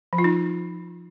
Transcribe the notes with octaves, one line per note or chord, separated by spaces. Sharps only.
F3
F4
D#4